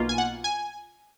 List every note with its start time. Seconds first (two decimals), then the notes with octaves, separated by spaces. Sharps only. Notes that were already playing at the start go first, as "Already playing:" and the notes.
Already playing: B1 B2 A#3 F4
0.09 G#5
0.18 F#5
0.44 G#5